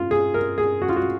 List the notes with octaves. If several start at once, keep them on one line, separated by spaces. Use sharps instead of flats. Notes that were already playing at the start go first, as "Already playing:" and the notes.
Already playing: F4
G#4
A#4
G#4
F#4
F4
F#4